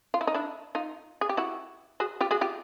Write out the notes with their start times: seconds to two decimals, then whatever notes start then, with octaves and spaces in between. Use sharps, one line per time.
0.14 F4
0.21 E4
0.27 D#4
0.34 D4 E4
0.75 D#4 F4
1.21 G#4
1.29 G4
1.37 E4 F#4
2.00 F#4 G#4
2.21 F4 G4
2.31 F#4 G#4
2.41 F4 G4